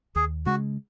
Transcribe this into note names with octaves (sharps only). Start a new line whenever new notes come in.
D#2 G#4
C#3 G#3 F#4